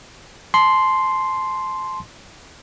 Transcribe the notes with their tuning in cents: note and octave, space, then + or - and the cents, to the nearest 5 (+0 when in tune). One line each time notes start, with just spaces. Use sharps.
A5 -30 C6 +0